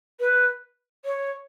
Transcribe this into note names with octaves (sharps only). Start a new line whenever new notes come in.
B4
C#5